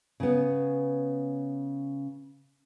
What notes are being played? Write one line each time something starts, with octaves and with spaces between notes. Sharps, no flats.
C#3 B3